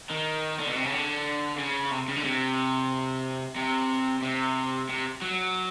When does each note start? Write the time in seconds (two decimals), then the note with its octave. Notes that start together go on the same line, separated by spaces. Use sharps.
0.11 D#3
0.60 D3
0.68 B2
0.76 C3
0.85 C#3
0.93 D3
1.58 C#3
1.91 C3
2.08 C#3
2.16 D3
2.24 C3
3.56 C3
4.22 C3
4.89 C3
5.22 F#3